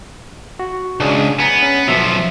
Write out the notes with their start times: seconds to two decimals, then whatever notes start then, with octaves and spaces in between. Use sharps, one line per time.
0.59 F#4
1.00 C#2 D4 G#4
1.39 B3 G#5 A#5
1.62 C#4
1.87 B1 B2 F3 E5 C6